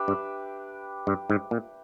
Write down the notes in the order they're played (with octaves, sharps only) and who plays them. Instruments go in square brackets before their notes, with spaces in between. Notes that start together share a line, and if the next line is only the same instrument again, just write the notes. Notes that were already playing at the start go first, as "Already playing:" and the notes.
Already playing: [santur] D4 G4 B4 E5
[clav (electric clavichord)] G2
G2
G#2
A#2